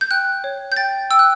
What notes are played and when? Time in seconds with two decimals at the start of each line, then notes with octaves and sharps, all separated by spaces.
0.01 G6
0.11 G5 F#6
0.44 C#5
0.72 G6
0.76 G5 A6
1.11 G5 E6
1.19 F#6